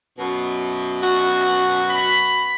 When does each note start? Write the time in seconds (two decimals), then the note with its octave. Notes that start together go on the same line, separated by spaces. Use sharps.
0.18 F#2 B2
1.03 F#4
1.90 B5